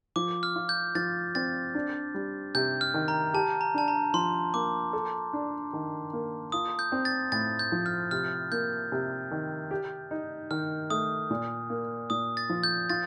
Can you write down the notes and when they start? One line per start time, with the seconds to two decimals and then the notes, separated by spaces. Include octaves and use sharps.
0.16 F3 D6
0.43 F6
0.56 F4
0.69 G6
0.95 F3 A6
1.35 C4 A6
1.75 D4
2.14 G3
2.55 C3 G6
2.81 F6
2.94 D#3
3.08 A#5
3.34 G4 A5
3.61 A#5
3.74 D4 A5
3.88 A#5
4.14 F3 C6
4.54 A#3 D6
4.93 A4
5.33 D4
5.73 D#3
6.13 A#3
6.52 F4 D#6
6.79 G6
6.92 C4
7.05 A6
7.32 A2 A6
7.59 G6
7.72 F3
7.86 F6
8.11 C3 F6
8.52 A#3 G6
8.92 C3
9.31 D#3
9.71 G4
10.11 D#4
10.51 D#3 F6
10.90 A3 D#6
11.30 A#2
11.70 A#3
12.10 A#2 D#6
12.37 A6
12.50 F3
12.63 G6
12.90 F4 A6